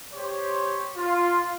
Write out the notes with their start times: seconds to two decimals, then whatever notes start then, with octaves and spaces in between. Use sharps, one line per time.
0.13 G4 C5 C#5
0.95 F4